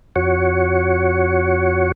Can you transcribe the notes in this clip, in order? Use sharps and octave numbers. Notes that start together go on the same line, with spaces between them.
F2 F#4 C#5